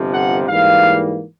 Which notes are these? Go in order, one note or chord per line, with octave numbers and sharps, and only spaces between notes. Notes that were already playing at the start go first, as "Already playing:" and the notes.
Already playing: G1 F2 C3 F3
F#5
G#2 E3 G3 A#3 F5